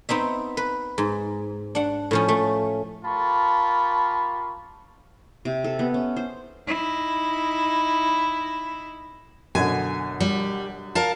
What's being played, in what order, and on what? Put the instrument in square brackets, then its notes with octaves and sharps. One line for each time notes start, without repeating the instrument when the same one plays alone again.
[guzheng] B3 C4 D#4 E5
B4
G#2
D4 F#5
A2 F3 C#4
A3
[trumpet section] F4 G4 A#4 A5 B5 C#6
[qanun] C3
A4
B3
C#4
C5
[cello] D#4 E4
[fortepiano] F#2 B2 D3 [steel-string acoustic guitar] G#5
[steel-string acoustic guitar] G3
A#4 F5 A5